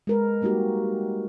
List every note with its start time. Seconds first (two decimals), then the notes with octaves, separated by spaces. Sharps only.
0.07 G#3 A#4 B4
0.42 G3 A#3 D#4 F#4 G4